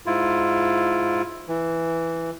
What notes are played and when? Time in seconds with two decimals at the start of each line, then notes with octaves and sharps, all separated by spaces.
0.06 G#2 E4 F4
1.48 E3